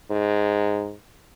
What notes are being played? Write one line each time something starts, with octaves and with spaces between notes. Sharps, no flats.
G#2